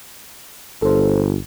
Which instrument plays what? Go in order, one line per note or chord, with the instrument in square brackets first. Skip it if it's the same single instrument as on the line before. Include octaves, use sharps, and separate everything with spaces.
[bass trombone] G1 [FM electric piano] A4 C5